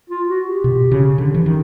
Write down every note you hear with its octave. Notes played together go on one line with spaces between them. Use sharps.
F4
F#4
G4
B2
C#3
D3
E3
D#3